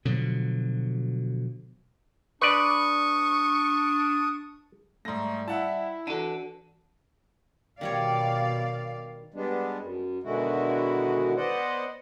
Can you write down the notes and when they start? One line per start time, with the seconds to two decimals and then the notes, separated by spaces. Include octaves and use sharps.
0.05 B2 D3 F3 F#3
2.42 D4 B4 D5 C#6 D#6
5.05 G#2 G3 A3 A#6
5.48 E4 E5 F#5 A5
6.07 E3 D4 F#4 A4 D#7
7.81 B2 D#3 G3 C#5 D5 F5
9.34 G3 G#3 B3 D4
9.80 F#2
10.23 B2 D3 D#3 G#3 E4 F#4
11.37 B3 C5 D5 D#5 F#5